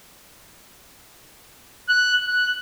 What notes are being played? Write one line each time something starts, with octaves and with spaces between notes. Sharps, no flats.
F#6
F#6